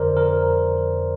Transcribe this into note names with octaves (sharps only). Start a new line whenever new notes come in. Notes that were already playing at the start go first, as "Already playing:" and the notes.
Already playing: F2 D3 A#4 C5 D5
A#4